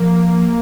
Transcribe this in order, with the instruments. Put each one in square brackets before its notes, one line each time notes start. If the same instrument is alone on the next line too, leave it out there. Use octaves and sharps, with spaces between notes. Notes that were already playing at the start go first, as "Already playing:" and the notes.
Already playing: [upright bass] F3 [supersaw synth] A#3